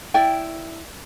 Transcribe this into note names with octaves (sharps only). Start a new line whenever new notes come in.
E4 D5 G5